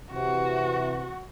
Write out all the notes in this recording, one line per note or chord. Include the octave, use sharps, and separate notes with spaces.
C3 E3 F#4